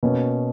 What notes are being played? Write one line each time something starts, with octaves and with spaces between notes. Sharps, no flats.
B2 A#3 C#4 B4